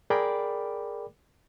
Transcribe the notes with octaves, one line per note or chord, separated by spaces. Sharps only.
G#4 A#4 D5 G5 B5 D6